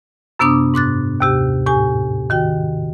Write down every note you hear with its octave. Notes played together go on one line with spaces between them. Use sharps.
F#2 C3 B3 D4 D6 D#6
G#2 D6 F#6 A6
D#2 C3 G4
A2 G4 G#5
D#3 F#4 G5